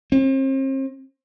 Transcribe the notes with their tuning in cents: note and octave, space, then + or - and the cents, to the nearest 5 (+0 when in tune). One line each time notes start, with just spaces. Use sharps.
C4 +40